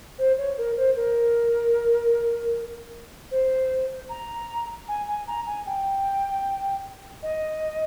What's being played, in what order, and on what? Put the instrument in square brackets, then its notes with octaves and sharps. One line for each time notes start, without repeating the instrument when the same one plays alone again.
[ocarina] C5
C#5
A#4
C5
A#4
C5
A#5
G#5
G#5
A#5
G#5
G5
D#5